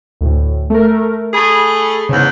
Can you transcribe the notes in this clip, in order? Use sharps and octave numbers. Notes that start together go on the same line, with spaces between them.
D2 A2
A3 A#4
A3 G#4 B5
E2 G#2 C#3